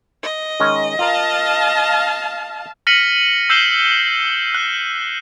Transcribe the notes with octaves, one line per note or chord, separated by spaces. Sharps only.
D#5
D#3 G#3 C#4
F4 A#4 F5 A5
F6 A#6 B6 C#7 D#7 F#7
E6 G6 C7 E7 G7
F#6